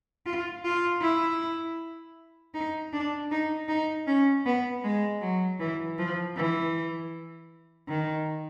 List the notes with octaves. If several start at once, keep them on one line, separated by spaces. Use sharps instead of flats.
F4
F4
E4
D#4
D4
D#4
D#4
C#4
B3
G#3
F#3
E3
F3
E3
D#3